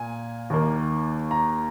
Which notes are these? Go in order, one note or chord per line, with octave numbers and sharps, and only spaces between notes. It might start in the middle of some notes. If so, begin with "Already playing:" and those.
Already playing: A#2 G#5
D#2 D#3 A#3
A#5